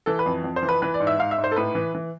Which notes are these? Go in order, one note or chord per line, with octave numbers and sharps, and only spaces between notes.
E3 A4
B4
F2
F2
C5
E3
B4
E3 B4
D5
G#2
E5
G#2 F5
E5
G#2
C5
A4
A2 B4
E3
E3